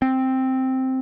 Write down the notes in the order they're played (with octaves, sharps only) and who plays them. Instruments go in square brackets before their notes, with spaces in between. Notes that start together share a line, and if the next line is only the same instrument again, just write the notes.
[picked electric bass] C4